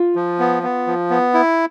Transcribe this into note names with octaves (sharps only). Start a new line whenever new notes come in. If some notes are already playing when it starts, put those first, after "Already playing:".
Already playing: F4
F3
B3
B3
F3
B3
E4